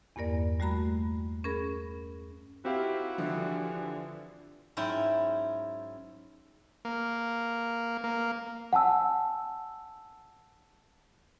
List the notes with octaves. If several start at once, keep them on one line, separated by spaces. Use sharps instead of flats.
E2 G2 A#3 A#4 D5
G2 G3 A3 F#4 A#5 B5
C#4 G#4 A#4 B5
A#3 C4 D#4 E4 F#4 G4 F5
D3 E3 F3
G#2 F#3 C#4 E4 F#4 G5
A#3
A#3
F#5 G#5 A5 E6